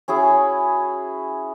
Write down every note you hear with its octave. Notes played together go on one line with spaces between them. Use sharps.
C#4 E4 F#4 G#4